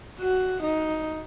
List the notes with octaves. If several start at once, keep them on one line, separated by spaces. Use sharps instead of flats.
F#4
D#4